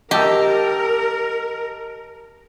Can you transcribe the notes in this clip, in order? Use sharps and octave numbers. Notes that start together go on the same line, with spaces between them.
G4 A#4 D#5 A5 E6